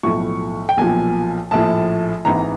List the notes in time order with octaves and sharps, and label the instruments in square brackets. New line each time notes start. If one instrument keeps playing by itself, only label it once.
[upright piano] B1 A2 F3 C#6
G5
B1 A#2 F3 G#5
A#1 A2 F3 A5
G#1 G#2 E3 A#5